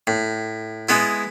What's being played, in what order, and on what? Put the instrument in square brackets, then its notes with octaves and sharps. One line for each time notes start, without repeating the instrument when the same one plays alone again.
[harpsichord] A2
G#3 B3 E4